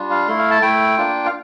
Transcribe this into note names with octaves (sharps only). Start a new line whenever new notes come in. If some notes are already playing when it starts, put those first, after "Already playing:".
Already playing: G3 D4 F4
F5
A3 E4 C6
F5
A5
A3 E4 G5
A#3 D4 F4
F5